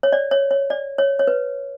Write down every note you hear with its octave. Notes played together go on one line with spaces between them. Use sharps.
C#5
D5
C#5
C#5
D5
C#5
C#5
B4